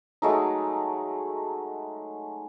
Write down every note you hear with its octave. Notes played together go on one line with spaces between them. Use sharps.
F#3 G#3 A3 D#4